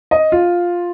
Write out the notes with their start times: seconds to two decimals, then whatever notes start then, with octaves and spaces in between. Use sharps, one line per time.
0.11 D#5
0.32 F4